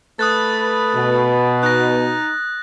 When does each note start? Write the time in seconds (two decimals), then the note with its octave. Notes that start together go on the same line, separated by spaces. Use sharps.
0.19 A3 B4 D#6 F#6 A6
0.95 B2
1.63 D#4 F#6 A#6